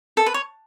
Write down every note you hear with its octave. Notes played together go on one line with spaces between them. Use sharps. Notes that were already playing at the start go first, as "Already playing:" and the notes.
A4
B4
C#5